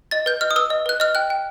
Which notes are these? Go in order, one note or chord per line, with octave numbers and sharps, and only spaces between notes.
D#5 A6
B4 G6
D#5 F6
D#6
B4 E6
D#5
B4 F#6
D#5 F6
G5 F#6
G5